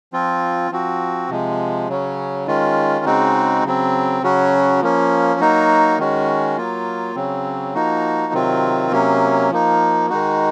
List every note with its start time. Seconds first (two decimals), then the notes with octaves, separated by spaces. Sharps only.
0.13 F3 C4 F4
0.71 F3 C4 F#4
1.30 C3 F3 G#3
1.89 C#3 F#3 C#4
2.47 D#3 G#3 C#4 F4
3.05 C#3 G#3 C4 D#4 F#4
3.64 C#3 F#3 C4
4.22 C#3 F#3 C#4 F#4
4.81 F3 A#3 C#4
5.40 F#3 A#3 D#4 F#4
5.98 D#3 G#3 C#4 F#4
6.57 F#3 A#3 F4
7.15 C#3 F#3 C4
7.75 F3 A#3 D#4 F#4
8.33 C3 D#3 F#3 C4 F4
8.91 C3 F#3 A#3 C#4
9.50 F3 A#3 D#4
10.09 D#3 G#3 D#4 F#4